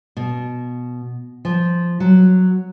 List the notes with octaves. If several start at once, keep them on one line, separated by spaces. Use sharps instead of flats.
B2
F3
F#3